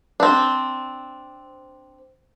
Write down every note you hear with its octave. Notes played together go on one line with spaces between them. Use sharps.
C4 D4